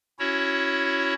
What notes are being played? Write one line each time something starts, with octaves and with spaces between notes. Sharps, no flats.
C#4 E4 F#4 C#5